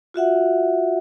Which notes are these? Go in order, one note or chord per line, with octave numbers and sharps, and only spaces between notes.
F4 F#4 E5 F#5